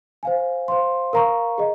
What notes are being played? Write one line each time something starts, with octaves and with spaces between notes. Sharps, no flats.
C5 F5 G#5
C5 F5 C6
A#4 F5 A#5 C#6
G#4 D#5